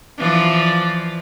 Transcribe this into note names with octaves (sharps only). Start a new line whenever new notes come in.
E3 F3 D5